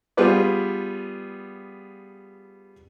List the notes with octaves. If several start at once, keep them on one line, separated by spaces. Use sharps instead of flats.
G3 B3 F4 G#4 B4 D5